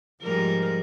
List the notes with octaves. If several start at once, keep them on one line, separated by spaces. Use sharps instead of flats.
G#2 F3 G3 A#4